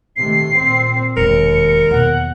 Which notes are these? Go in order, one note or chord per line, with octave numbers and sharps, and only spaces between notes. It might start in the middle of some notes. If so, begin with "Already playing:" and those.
C3 D#3 A3 C7
A#2 C4
E1 D#2 E4 A#4 C#7
E2 B2 F#5